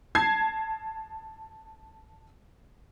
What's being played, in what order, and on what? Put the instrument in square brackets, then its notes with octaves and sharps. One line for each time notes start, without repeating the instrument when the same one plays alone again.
[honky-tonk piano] A5 G#6 C7